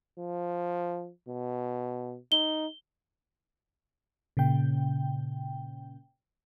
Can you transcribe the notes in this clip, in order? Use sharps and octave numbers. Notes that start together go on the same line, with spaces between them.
F3
B2
D#4 G7
A#2 C#3 G5